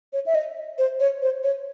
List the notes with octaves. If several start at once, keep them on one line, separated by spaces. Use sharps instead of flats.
C#5
E5
D#5
C5
C#5
C5
C#5